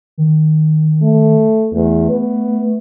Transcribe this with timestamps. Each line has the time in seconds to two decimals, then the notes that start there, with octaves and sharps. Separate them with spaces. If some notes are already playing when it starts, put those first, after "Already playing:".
0.18 D#3
1.02 A3
1.73 E2 A3
2.10 B3